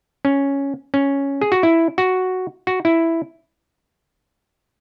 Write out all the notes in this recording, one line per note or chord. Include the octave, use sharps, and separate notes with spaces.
C#4
C#4
G#4
F#4
E4
F#4
F#4
E4